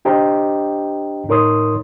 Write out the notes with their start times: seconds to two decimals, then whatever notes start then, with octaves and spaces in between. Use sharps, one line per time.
0.05 D4 G4 C5 D#5 G5 A#5
1.28 A2 D#4 A#4 C#5 C6 D#6